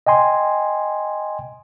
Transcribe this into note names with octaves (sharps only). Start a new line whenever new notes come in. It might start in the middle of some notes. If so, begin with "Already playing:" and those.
D#5 G5 G#5 C6